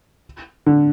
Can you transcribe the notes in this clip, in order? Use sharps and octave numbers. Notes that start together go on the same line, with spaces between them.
D3